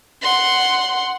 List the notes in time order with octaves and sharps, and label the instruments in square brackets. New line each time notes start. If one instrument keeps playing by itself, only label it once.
[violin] F#5 C6